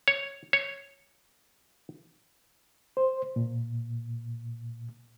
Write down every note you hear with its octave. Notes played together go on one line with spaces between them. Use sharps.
C#5
C#5
C5
A#2